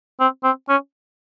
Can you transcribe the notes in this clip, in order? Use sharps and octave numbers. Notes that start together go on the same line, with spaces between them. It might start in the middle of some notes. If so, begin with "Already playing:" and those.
C4
C4
C#4